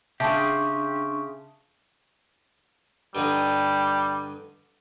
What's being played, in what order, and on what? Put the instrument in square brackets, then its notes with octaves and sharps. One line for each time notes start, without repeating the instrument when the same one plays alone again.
[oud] C#3 [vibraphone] D4 C6 C#6 [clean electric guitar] G4 [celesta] E5 A5
[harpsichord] G2 D3 D#4 [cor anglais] G3